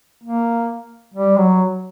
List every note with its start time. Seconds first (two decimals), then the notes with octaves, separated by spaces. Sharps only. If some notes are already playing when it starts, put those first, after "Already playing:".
0.24 A#3
1.14 G3
1.38 F#3